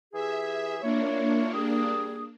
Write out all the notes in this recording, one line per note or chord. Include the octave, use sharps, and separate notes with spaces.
E3 G4 G#4 E5
A#3 D4 E4 F4 C#5
G3 G#4 D#6